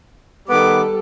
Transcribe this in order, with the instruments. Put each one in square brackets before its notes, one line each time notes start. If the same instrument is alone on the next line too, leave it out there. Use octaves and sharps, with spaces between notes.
[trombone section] D#3 B3 B4 [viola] G3 A4 [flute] D6